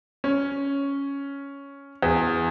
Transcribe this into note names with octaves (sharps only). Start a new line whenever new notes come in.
C#4
E2